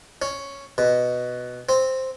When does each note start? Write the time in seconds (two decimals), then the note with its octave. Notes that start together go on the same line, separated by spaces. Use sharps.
0.22 C#4
0.78 B2
1.69 C4